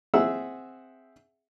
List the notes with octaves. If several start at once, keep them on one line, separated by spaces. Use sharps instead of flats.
C4 G#4 E5 F#5 E6